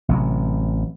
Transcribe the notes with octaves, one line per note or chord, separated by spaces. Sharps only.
A1 C3 F#3